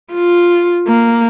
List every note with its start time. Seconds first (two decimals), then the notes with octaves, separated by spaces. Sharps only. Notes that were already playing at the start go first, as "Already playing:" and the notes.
0.13 F4
0.88 A#3